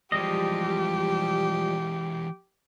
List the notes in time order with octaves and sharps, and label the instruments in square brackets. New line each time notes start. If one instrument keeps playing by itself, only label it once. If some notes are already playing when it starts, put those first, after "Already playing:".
[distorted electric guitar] E3 G#3 [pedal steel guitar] F3 G3 D#5 [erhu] G4